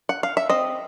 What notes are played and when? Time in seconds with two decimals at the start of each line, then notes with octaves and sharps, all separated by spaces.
0.09 F#5
0.23 F5
0.37 E5
0.50 C4 D#5